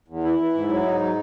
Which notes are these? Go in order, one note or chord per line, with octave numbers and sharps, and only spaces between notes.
E2
E3 E4
E3
G#2
F#3
G#2 D#4
F#3